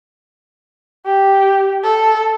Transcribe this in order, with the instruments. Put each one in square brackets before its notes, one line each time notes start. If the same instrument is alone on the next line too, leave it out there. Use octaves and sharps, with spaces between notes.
[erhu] G4
A4